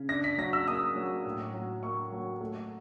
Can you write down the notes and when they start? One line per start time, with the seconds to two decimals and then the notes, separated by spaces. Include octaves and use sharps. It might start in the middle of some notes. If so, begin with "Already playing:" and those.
Already playing: C#3
0.09 D4 A#6
0.24 B6
0.38 F#3 A#6
0.53 E6
0.67 A#3 D#6
0.96 F#3
1.25 A2
1.54 F#3
1.83 A#3 C#6
2.12 F#3
2.41 A3